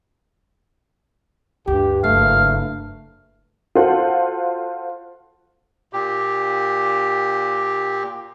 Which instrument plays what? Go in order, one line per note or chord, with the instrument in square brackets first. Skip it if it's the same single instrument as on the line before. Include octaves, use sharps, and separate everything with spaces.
[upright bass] D2 [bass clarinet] G2 [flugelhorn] G4
[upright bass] F#1 [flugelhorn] A3 [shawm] F5
[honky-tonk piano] F4 F#4 A4 C5 F#5
[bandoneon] A#2 G4